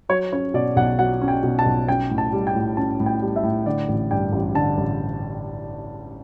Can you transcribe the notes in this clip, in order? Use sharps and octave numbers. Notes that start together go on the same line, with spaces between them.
F#3 C#5
C#4 C#5
B2 D5
B1 F#5
F#3 F#5
C#4
G5
B2
A5
B1
C#4 G5
A2
A5
G3
G5
A2
C#4 A5
A2
G5
G3
E5
A2
D3 D5
A1
G2 G5
A1
D3 A5
A1